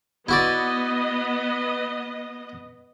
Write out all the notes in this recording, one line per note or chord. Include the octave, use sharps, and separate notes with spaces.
B3 E4 F#4 D5 D#5